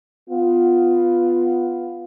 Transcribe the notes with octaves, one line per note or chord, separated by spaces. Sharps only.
B3 F4